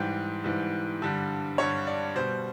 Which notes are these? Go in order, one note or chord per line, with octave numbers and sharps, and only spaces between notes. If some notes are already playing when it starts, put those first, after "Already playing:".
Already playing: G#2 E3 G3 G4
G#2 E3 G3
G2 D3 G3
G2 D3 G3 C#5
D5
B2 G3 C5